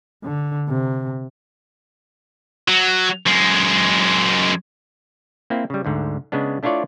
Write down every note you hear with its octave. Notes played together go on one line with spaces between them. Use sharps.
D3
C3
F#3
F#2 G#3
A#3 C4 E4
C#3 G3
D2 G#2 D3
C#3 G#3 B3 D4
A3 D4 E4 F4 C#5 D5